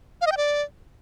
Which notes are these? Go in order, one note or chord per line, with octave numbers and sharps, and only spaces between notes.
F5
D#5
G5
D5